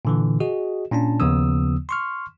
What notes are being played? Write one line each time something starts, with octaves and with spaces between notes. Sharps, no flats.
A#2 D3 E3
F#4 G#4 D#5
A#2 C#4 D4 A5
D#2 C#3 F3 B3 D#6 E6
C6 C#6 F6